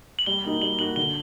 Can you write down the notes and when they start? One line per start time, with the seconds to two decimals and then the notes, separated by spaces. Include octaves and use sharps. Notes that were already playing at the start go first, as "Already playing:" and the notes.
0.19 F#7
0.26 G3 G7
0.44 A#3 D#4 F#4
0.62 G3 F#7
0.79 A#3 D#4 F#4 F#7
0.96 D3 G7